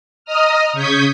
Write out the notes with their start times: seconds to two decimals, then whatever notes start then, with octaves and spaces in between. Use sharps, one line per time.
0.25 D#5 A#5 D#6 F6
0.73 C#3 C#6 D#6 G6 G#6 B6